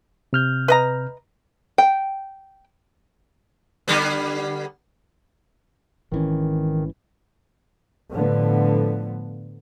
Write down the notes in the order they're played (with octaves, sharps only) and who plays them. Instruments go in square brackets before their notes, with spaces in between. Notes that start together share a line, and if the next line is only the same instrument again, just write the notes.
[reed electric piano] C3 F6 G6
[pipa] B4 D#5 A#5
[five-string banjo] G5
[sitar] D3 G3 B3
[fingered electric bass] G#1 E3 C#4 [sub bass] D#3
[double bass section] A2 D3 F3 B3